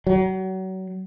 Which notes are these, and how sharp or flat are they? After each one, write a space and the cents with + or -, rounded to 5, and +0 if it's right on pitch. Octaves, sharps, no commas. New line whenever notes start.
F#3 +30